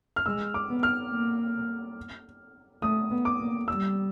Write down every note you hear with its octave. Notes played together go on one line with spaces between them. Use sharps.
F6
G#3 E6
D6
B3
F6
A#3
A3 D#6
B3
D6
A#3
G3 E6